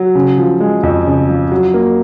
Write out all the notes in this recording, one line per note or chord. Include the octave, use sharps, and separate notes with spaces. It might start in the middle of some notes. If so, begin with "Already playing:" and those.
Already playing: F#3
C#3
F3
G#3
F2
C#3
F3
F#3
A#3